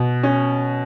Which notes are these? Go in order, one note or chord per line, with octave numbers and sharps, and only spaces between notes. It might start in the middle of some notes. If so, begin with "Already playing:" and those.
Already playing: B2
C#4